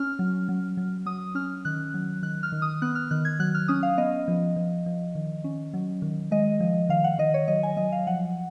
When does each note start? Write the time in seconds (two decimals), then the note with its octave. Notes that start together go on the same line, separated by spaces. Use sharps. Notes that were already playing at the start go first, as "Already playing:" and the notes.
Already playing: C#4 F6
0.19 F#3
0.48 F#3
0.77 F#3
1.06 F#3 D#6
1.35 C#4 F6
1.65 D#3 F#6
1.94 F#3
2.22 D#3 F#6
2.43 F6
2.52 D#3
2.62 D#6
2.82 B3 F#6
2.95 F6
3.11 D#3 F#6
3.25 G#6
3.40 F#3 F#6
3.55 F6
3.68 C#4 D#6
3.83 F5
3.98 B3 D#5
4.28 F3
4.56 F3
4.86 F3
5.15 D#3
5.44 C#4
5.74 F#3
6.02 D#3
6.31 G#3 D#5
6.60 F3
6.89 D#3 F5
7.04 F#5
7.18 D#3 D#5
7.34 C#5
7.48 F#3 D#5
7.63 G#5
7.77 F#3 D#5
7.92 F5
8.07 F3 F#5